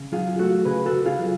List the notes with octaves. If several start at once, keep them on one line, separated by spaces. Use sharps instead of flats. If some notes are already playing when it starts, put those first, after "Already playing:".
Already playing: C#3
F#3 F4 G#4
A3 F#4 A4
C#3 G#4 B4
F#4 A4
C#3
F4 G#4
F#3